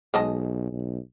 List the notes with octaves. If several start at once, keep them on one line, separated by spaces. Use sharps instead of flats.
B1 G#3 D#5 A5
B1